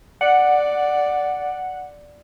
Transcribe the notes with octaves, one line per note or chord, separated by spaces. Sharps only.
D5 F#5